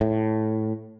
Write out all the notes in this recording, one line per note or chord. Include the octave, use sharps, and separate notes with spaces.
A2